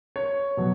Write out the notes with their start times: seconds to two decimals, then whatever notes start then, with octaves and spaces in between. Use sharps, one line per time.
0.16 C#5
0.57 B2 F#3